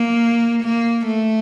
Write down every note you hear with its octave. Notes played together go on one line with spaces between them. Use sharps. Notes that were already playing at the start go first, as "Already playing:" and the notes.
Already playing: A#3
A#3
A3